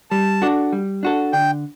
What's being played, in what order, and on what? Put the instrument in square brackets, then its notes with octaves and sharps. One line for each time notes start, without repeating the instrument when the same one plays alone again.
[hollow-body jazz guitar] G3 [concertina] A5
[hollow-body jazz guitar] D4 F#4 A4
G3
D4 F#4 A4
[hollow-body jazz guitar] D3 [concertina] G5